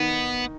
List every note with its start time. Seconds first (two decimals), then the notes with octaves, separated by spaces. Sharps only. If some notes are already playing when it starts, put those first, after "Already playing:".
Already playing: D#3 B3 D#4